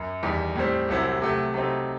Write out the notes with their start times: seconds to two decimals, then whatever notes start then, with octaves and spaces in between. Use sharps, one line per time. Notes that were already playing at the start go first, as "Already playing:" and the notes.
Already playing: F#2
0.23 E2 D#3 G3
0.55 A2 G3 C4
0.88 C2 C3 F#3 C4 E4
1.22 C3 F#3 A3
1.54 C3 F#3 A3 C4 D#4